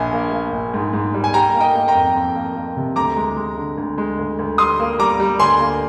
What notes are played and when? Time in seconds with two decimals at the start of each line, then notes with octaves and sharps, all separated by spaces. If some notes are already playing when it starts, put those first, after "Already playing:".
Already playing: A#1 A#3 G#5
0.12 A#3
0.32 A#3
0.52 A#1
0.74 G#2
0.93 G#2
1.14 G3
1.24 G#5
1.33 G3 G5 A#5
1.54 A#3
1.61 D#5 G5
1.75 A#3
1.88 G5 A#5
1.95 F2
2.16 F2
2.35 A#3
2.56 A#3
2.77 C3
2.96 D2 A#5 D6
3.17 G#3
3.37 G#3
3.57 D3
3.78 D2
3.98 G#3
4.19 D2
4.39 D2
4.58 G3 C6 D#6
4.80 A#3
4.99 G3 A#5 D6
5.20 G3
5.40 D2 G#5 C6
5.60 A#3